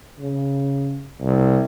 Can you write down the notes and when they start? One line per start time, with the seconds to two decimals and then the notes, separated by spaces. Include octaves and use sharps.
0.19 C#3
1.21 C2